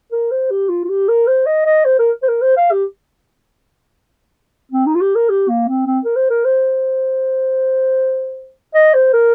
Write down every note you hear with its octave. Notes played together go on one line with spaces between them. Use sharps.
A#4
C5
G4
F4
F4
G4
A#4
C5
D#5
D#5
C5
A#4
C5
A#4
C5
F5
G4
C4
D#4
F4
G4
A#4
G4
A#3
C4
C4
A#4
C5
A#4
C5
D#5
C5
A#4